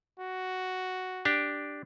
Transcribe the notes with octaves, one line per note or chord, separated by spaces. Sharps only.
F#4
D4 G4